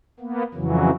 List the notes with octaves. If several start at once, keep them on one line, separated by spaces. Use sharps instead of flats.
A#3 B3
F2 C#3 E3 F#3